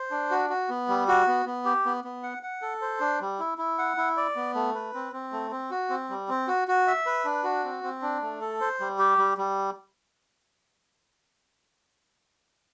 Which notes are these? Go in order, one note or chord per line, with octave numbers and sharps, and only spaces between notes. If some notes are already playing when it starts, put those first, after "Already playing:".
Already playing: C5
D4
F#4
F#4
B3
G3
F#4
B3
B3
G4
B3
B3
F#5
F#5
A4
C5
D4
G3
E4
E4
F#5
E4
D5
B3
A3
B4
C4
C4
A3
C4
F#4
C4
G3
C4
F#4
F#4
E5
B4
D4
F#4
C4
C4
D4
A3
A4
C5
G3
G4
G3
G3